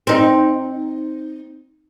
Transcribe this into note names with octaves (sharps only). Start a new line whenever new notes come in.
C4 D#4